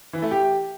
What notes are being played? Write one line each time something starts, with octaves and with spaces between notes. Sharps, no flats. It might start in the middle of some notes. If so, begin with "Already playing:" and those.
E3
A3
G4